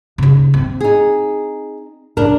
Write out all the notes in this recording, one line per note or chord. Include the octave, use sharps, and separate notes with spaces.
C#3 D#4
C4
D#4 G#4
A#1 D4 A#4